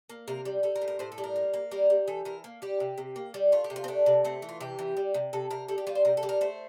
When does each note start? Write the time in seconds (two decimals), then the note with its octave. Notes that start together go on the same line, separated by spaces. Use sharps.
0.10 A#3
0.28 C3 A#4
0.45 G3
0.63 G3 A4
0.76 A#4
0.82 A2
0.88 A#4
0.99 A2 C5
1.12 A4
1.18 G3
1.24 A#4
1.36 A#3
1.54 A#3
1.72 G3 A#4
1.90 G3
2.08 E3 A4
2.25 E3 A#4
2.44 A#3
2.62 G3 G4
2.80 C3
2.98 C3
3.16 A#3
3.34 G3
3.52 A3 F4
3.64 G4
3.70 C3
3.76 F4
3.84 C4
3.88 A3 D4
4.06 C3
4.25 A3 C4
4.42 E3
4.49 F4
4.60 C3 G4
4.79 E3
4.97 G3
5.14 C3
5.33 C3 A4
5.51 C3 A#4
5.68 G3 A4
5.78 G4
5.87 G3 F4
5.95 C5
6.05 C3 A#4
6.17 A4
6.23 G3
6.29 A#4
6.41 A3 C5